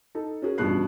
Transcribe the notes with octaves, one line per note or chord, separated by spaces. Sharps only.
D#4 A4
C#4 F#4 G#4 A#4
A1 G2 B2 F3 F#6 C7